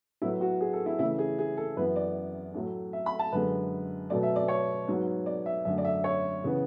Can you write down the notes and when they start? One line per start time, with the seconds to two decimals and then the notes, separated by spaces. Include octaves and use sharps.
0.22 A2 F#3 B3 E4
0.41 F#4
0.60 G#4
0.73 A4
0.86 E4
0.99 C#3 E3 A3 E4
1.18 G#4
1.38 G#4
1.57 A4
1.76 F#2 E3 B3 B4
1.96 D5
2.54 A2 F#3 A3
2.93 E5
3.06 B5
3.19 A5
3.32 F#2 D3 G#3 B4
4.09 B2 F#3 A3 D5
4.23 E5
4.36 D5
4.48 C#5
4.87 G#2 F#3 B3
5.26 D5
5.46 E5
5.65 F#2 D3 A3 E5
5.78 D5
5.85 E5
6.04 C#5
6.44 C#3 E3 B3